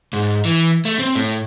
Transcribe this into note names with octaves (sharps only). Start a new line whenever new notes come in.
G#2
E3
A3
C4
A2